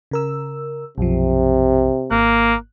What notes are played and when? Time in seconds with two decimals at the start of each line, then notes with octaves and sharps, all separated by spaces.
0.11 C#3 A#4 E6
0.98 B1 F#2 C3 F3
2.11 G#1 A#3 F#6